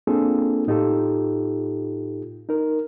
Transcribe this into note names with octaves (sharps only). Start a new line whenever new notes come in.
A#3 C4 D4 F4 G#4 A4
A2 D#4 F4 G4 A4
D#4 A#4